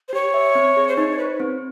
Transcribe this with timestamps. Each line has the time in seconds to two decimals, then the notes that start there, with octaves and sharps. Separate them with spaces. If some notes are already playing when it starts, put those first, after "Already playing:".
0.08 C5
0.13 G4 C#5
0.34 E5
0.55 C4
0.77 G#4
0.89 C5
0.97 D#4 C#5
1.19 B4 C5
1.40 C4